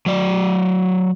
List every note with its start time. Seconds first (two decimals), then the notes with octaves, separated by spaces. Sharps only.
0.06 F#3 D5